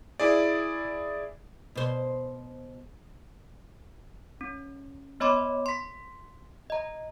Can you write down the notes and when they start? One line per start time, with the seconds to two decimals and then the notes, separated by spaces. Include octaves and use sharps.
0.19 E4 G#4 D5
1.75 B2 C5
4.41 C#4
5.20 B3 C#5 D#5 B5 C6 D6
5.66 C6 B6
6.70 D#5 A#5